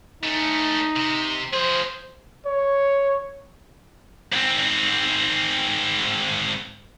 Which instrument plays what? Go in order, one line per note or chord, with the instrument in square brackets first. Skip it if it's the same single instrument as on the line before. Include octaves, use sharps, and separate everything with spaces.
[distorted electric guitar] A3 C#4 [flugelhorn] D#4
[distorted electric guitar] C3
[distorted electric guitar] F3 G#4 [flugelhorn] C5
[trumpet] C#5
[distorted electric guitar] G#2 C4